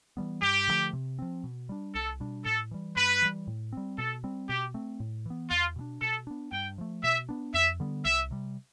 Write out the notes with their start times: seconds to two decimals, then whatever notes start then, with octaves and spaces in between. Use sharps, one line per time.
0.17 E3 G3 B3
0.42 G2 G4
0.68 D3 F3 A3
0.93 C3
1.19 F3 C4
1.44 B2
1.69 G3 D4
1.95 C2 A4
2.20 B2 G3 D4
2.45 A2 A4
2.71 E3 G3
2.96 G2 B4
3.22 E3 G3
3.47 A2
3.73 G3 C4
3.98 B2 A4
4.24 G3 C4
4.49 B2 G4
4.74 A3 C4
5.00 A2
5.26 E3 B3
5.51 E2 F4
5.76 B2 G3 D4
6.02 B2 A4
6.27 B3 D4
6.52 G2 G5
6.78 F3 A3
7.03 B2 E5
7.29 B3 D4
7.54 F2 E5
7.80 D3 G3 B3
8.05 C2 E5
8.31 C3 G3